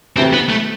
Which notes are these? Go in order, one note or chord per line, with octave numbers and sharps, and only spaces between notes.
D2 C3 E3 C4
B3
A3